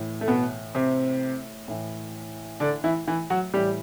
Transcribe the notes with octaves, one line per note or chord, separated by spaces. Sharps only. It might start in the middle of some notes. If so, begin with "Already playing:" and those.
Already playing: A2 E3
A3
B2 B3
C3 C4
A2 E3
D3 D4
E3 E4
E3 E4
F#3 F#4
A2 E3 G3 G4